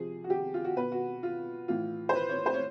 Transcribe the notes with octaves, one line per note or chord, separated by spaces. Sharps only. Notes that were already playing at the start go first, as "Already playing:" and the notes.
Already playing: C3 F3 G#4
F#4
G4
F4
F#4
B2 B4
F#4
F4
A2 E3 F4
C5
B4
C#5
C5
C#5